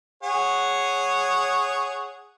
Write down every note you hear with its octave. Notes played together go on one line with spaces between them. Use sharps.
G#4 C#5 F#5